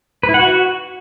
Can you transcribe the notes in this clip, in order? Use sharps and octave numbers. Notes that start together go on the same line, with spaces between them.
B4
E4
F#5
F#4